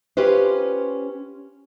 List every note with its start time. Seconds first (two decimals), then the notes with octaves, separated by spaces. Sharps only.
0.17 C#4 F4 G4 B4 C5